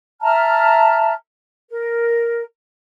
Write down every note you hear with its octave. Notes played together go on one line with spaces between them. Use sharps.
E5 A5 A#5 F6
A#4